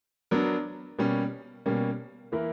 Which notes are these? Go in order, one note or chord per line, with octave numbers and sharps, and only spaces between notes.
F#3 B3 D4 A#4
B2 G3 A#3 C#4
B2 G3 A#3 C#4
E3 A#3 E4 A#4